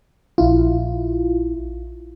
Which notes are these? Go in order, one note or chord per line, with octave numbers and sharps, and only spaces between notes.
A#1 E4 F4